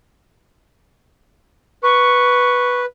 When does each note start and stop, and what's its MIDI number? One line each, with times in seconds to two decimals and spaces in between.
1.83 2.85 71
1.83 2.80 85